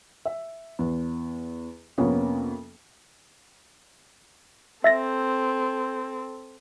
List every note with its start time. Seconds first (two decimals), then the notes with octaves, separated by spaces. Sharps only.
0.25 E5
0.79 E2
1.98 F2 C3 A#3 B3 C#4
4.84 C4 A4 E5 A6 A#6